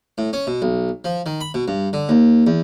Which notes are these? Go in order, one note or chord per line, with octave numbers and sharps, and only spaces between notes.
A2
C#4
B2
B1
F3
D#3
B5
B2
G2
D3
D#2
E2